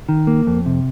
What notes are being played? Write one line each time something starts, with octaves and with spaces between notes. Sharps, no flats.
D#3
A#3
F2
C3